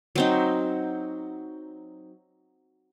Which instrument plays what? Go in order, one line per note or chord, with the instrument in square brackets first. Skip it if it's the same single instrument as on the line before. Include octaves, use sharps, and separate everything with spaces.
[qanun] F#3 C4 D#4